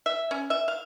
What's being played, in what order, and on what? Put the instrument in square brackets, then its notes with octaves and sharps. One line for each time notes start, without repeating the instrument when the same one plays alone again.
[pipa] E5
C#4
E5
F5